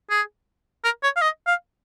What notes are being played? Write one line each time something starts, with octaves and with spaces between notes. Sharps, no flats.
G#4
A#4
C#5
F5
D#5
F5